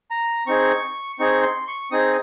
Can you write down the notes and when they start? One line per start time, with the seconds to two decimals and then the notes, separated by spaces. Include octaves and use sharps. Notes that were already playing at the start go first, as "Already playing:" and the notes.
0.11 A#5
0.47 C4 D#4 G#4 C#6
1.19 C4 D#4 G#4 C#6
1.43 C6
1.68 C#6
1.91 C4 D#4 G#4 D#6